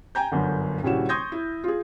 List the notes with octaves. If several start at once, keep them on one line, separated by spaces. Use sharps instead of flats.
G5 G#5 A#5 G6
G1 F#2 D3
D#1 C#3 G3 E4 F#4 E7
C6 C#6 D#6 G6 G#6 A#6
E4
F4 G#4